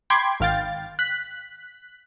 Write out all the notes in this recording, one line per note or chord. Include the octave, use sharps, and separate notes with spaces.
G5 B5 C6 D6 G#6
G#1 D#3 F5 G5 A6
F#6 B6